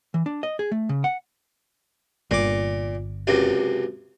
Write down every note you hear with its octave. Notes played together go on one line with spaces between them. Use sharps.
E3
D4
D#5
G#4
A3
C#3
F#5
G1 A#2 D6
C#2 F#2 C3